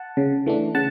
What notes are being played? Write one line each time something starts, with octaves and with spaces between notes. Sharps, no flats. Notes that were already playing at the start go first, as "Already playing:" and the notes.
Already playing: F#5 A5
C#3
E3 A3 D4
C#3 F#5 A5